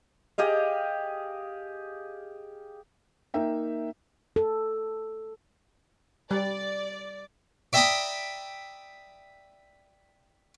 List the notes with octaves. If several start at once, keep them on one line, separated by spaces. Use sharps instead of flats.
G4 G#4 D#5 F5
A#3 D#4 E5 G5
A4
G3 D5
D5 E5 G5 A#5 B5 D#6